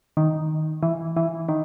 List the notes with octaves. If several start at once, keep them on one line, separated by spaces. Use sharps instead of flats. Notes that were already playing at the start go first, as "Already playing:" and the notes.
D#3
E3
E3
D#3